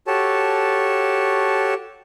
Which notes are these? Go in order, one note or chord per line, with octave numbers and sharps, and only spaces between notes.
F#4 G4 A4 C#5 A5